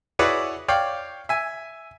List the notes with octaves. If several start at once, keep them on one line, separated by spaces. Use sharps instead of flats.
E4 F#4 G#4 B4 C#5 D5
C#5 D5 F5 G5
E5 G#5